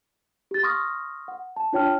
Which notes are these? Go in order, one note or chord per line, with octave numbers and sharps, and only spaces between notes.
G4 A6
C6 C#6 D#6 F6 A#6
F#5
A5
D4 F4 C#5 G5 A5 F6